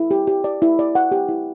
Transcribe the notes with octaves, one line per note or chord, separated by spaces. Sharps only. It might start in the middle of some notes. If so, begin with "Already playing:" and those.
Already playing: E4
G4
G4
D5
E4
D5
F#5
G4
E4